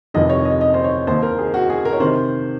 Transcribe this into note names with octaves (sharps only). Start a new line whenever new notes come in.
F1 F2 C3 D#3 D#5
C#5
D#5
D#5
C5
C#5
D#2 D#3 C5
A#4
G#4
F#4
G#4
A#4
C#5
C3 D#3 C5